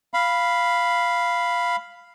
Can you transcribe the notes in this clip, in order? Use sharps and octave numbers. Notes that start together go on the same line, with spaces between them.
F5 B5